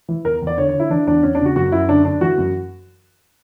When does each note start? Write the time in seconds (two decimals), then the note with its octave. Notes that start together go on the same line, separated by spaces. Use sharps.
0.09 E3
0.25 E2 A#4
0.42 E2
0.47 D5
0.57 D3 C#5
0.69 C#5
0.74 D3
0.80 E4
0.90 E3 D4
1.07 E2 D4
1.23 E2 C#4
1.35 D4
1.40 C#3
1.45 F#4
1.56 F#2 F#4
1.72 F#2 E4
1.89 D3 D4
2.05 D3 D4
2.21 E3 F#4
2.38 F#2